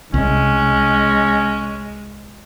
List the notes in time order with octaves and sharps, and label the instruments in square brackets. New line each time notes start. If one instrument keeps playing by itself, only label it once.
[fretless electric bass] C2 [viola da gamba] G#3 [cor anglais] C#4